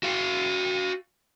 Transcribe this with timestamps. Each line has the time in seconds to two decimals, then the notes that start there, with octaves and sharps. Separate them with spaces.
0.03 F#4 F5